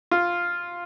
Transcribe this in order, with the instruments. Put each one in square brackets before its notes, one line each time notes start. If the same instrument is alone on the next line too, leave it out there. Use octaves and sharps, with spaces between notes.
[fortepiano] F4